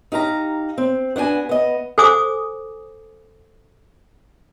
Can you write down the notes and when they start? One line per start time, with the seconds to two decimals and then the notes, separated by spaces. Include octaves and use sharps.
0.12 D#4 G4 F5 A#5
0.78 C4
1.16 B3 D4 F#4 G#5
1.49 B3 D#5
1.98 A4 C5 G#5 D6 D#6